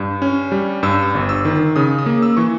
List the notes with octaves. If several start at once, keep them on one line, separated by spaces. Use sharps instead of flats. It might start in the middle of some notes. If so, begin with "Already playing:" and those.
Already playing: G2
C#4
G3
G2 E6
G1
E6
D#3
C#3 D#6
D#6
A#3
E6
E3 C#6